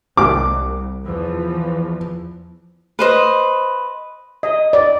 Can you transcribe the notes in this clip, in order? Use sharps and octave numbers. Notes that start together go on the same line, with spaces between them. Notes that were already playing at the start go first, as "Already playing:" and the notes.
C2 D6
E2 E3 F3
B4 C5 D#5
D#5
D5